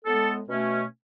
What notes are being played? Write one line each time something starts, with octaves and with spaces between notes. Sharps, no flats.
A2 G#3 B3 A4
B2 A3 C#4